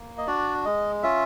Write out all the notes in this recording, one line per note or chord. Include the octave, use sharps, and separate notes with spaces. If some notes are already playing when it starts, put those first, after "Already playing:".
Already playing: A#3
D#5
D4 F#4 D5
G#3 D#5
C#4 F4 E5